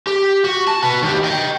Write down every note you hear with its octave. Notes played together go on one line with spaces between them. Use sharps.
G4
F#4
A5
F#4 B4
D#3 G4
D#5 G5